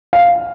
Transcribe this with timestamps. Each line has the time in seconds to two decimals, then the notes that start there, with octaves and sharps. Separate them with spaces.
0.13 F5